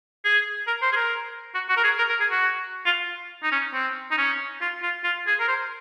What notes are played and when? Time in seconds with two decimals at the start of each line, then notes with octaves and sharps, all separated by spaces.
0.24 G#4
0.67 A#4
0.82 C5
0.92 G#4
0.96 A#4
1.55 F#4
1.69 F#4
1.77 A#4
1.84 G#4
1.98 A#4
2.10 A#4
2.20 G#4
2.31 F#4
2.86 F4
3.43 D#4
3.52 C#4
3.73 C4
4.11 D#4
4.18 C#4
4.61 F4
4.83 F4
5.04 F4
5.27 G#4
5.40 A#4
5.48 C5